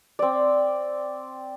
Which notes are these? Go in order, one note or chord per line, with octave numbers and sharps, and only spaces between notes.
C4 D5